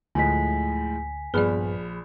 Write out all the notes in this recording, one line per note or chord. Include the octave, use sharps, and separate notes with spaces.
D2 A2 F3 G#3 G#5 B6
A#1 G2 B3 G#4 D5 B5 F6